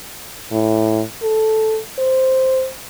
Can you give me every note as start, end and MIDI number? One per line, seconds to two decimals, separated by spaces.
0.52 1.02 45
1.22 1.78 69
1.99 2.69 72